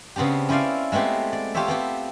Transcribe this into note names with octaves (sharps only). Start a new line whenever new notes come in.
C#3 B3 C4 D4 G4
C#4 E4 C5 D5 F5
G#3 A3 B3 C4 G4
D5
F4 G4 A4 C5 C#5 E5
B3 C4 G4